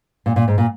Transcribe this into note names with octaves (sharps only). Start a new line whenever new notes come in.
A#2
A#2
G#2
A#2